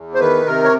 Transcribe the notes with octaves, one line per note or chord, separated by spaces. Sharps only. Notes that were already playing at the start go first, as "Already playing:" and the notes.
Already playing: E2
C5
D#3 B4
C3 A#4
C#5